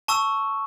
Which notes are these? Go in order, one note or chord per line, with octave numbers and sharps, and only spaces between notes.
A5 C#6 E6